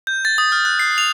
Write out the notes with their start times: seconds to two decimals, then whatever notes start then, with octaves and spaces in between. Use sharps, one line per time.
0.07 G6
0.25 A6
0.38 D#6
0.52 F6
0.65 F#6
0.79 C7
0.98 F7